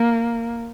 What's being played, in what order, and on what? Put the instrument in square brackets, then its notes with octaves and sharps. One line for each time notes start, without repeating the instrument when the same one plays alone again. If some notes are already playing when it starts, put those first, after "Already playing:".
Already playing: [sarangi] A#3